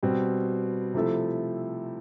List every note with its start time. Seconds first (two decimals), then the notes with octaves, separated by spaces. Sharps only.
0.03 B2 G3 C4
0.94 C3 F3 A3 E4 A4